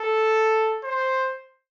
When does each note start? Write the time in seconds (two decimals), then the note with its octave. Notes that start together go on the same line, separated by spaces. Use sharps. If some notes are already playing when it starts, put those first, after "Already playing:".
Already playing: A4
0.84 C5